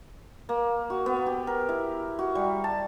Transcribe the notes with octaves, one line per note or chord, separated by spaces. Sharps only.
A#3
F#4
B3
G4
A#4
E4
F#4
G3
A5